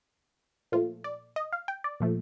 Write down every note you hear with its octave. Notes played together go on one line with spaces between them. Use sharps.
A#2 F3 A3 F4
D5
D#5
F5
G5
D5
A#2 F3 A3